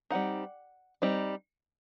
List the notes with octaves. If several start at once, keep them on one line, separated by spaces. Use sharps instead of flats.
G3 C4 D#4 F#5
G3 C4 D#4